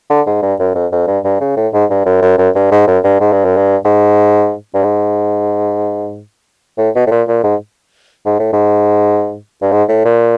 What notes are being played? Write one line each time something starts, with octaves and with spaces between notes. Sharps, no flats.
D3
G#2
G2
F#2
F2
F2
G2
G2
C#3
A2
G#2
G2
F#2
F#2
F#2
G2
G#2
F#2
G2
G#2
G2
F#2
G2
G#2
G2
G#2
A2
B2
A2
A#2
A#2
G#2
G#2
A2
G#2
G2
G#2
A2
A#2